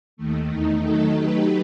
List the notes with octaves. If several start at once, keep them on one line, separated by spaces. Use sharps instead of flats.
D#2 D#3 A3
E2 D#3 A3 D#4
D#3 F#3 A3 D#4 A4
F#3 A3 D#4 G4 B4